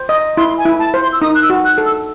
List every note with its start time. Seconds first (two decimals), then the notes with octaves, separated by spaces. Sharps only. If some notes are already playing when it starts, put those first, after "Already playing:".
Already playing: C5
0.09 D#5
0.37 E4 C6
0.58 G#5
0.65 E4
0.79 A5
0.94 C5
1.01 C6
1.13 E6
1.22 D#4 D#6
1.35 F#6
1.42 E6
1.50 F#4
1.65 F#6
1.78 A4
1.86 E6